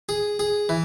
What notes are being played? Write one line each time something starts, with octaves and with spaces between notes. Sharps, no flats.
G#4
G#4
E3